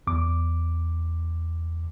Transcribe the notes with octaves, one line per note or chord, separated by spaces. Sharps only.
E2 D6